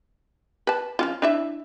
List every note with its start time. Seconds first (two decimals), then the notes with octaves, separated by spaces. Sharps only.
0.67 B4 A5
0.99 F3 C#4 F4
1.22 D4 E4 E5